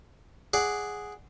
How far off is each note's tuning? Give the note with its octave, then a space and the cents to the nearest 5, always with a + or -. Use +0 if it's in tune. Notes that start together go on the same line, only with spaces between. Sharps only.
G#4 +0 D5 +0 F#5 +0